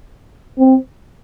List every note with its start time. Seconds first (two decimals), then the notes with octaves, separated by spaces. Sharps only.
0.59 C4